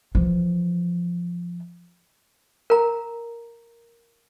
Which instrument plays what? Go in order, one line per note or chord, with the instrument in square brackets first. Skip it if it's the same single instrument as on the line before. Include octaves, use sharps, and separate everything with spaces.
[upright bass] E3 F3
[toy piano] A#4 A#5